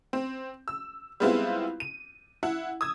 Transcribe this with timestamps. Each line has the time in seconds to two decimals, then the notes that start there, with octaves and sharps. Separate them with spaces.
0.13 C4
0.68 E6
1.20 G3 G#3 B3 C4 E4 F4
1.80 D#7
2.43 E4 F#5
2.81 D#6 E6 G#6